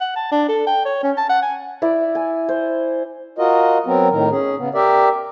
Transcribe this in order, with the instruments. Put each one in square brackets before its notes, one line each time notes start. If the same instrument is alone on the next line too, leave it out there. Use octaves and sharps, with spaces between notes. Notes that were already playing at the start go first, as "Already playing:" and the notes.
[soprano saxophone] F#5
A5
D4
A4
G5
C#5
C#4
A5
F#5
G#5
[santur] E4 D5
G#5
C5
[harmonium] F4 F#4 A#4 D#5
F#3 B3 C4 A#4
A2 D#3 A#4
C#4 G#4
C#3 B3
G4 A#4 D5 E5